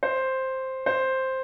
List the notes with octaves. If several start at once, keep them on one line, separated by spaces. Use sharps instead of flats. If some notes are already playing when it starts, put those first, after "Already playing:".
C5
C5